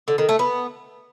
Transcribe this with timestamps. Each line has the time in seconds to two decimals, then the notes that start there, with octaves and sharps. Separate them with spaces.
0.08 D3
0.18 D#3
0.29 A3
0.39 B3